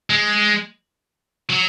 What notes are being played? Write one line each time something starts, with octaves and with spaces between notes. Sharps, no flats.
G#3
F#3